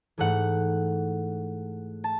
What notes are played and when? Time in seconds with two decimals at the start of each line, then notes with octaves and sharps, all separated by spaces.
0.18 G#2 E3 A3 F#5
2.04 A5